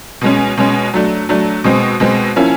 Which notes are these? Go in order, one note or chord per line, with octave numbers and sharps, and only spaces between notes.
B2 G#3 C#4
B2 G#3 C#4
F#3 A3 D4
F#3 A3 D4
B2 G#3 C4
B2 G#3 C4
F3 A#3 C#4 E4